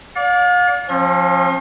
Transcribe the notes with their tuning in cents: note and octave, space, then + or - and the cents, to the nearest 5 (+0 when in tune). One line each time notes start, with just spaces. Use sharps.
D5 -25 F5 +40
F3 +15 C#4 -40 C6 +40